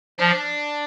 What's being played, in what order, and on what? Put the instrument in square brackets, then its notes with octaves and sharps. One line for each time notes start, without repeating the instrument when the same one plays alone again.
[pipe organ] F3 [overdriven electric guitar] D4